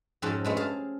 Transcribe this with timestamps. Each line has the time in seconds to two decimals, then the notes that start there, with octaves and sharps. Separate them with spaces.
0.22 F2 G#2 C4 C#4 F#4 A5
0.44 G2 G#3 A3
0.57 G#4 F5 A5